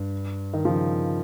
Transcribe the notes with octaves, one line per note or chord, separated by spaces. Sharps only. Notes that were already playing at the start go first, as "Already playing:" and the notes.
Already playing: G2
D#3
C#3 F3